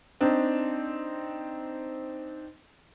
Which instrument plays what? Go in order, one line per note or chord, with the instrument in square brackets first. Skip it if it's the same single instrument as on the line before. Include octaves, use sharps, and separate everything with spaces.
[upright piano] C4 D4 D#4